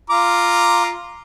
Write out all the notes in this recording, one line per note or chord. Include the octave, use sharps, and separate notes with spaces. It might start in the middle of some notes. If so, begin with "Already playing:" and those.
F4 A#5 D6